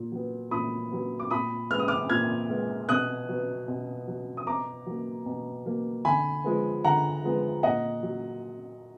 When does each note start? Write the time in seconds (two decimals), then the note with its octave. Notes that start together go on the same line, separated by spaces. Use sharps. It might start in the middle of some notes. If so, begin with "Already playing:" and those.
Already playing: A#2
0.12 F#3 B3
0.51 A#2 B5 D#6
0.92 F#3 B3
1.19 D6
1.30 A#2 B5 D#6
1.71 G#3 B3 F6
1.79 D#6
1.88 D6 F6
2.10 A#2 F6 G#6
2.49 G#3 B3
2.89 B2 D#6 F#6
3.29 F#3 B3
3.68 B2
4.08 F#3 B3
4.37 D#6
4.47 B2 A#5 D6
4.86 F#3 A#3
5.26 B2
5.66 F#3 A#3
6.05 D3 G#5 B5
6.44 F3 G#3 B3
6.84 D3 F#5 A#5
7.24 F3 G#3 B3
7.63 A#2 D#5 F#5
8.03 F#3